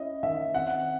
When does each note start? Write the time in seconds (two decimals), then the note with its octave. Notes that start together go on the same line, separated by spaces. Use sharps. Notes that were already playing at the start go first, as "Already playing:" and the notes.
Already playing: C#4 E4 D#5 E5
0.23 D#3 E5
0.54 C4 F#5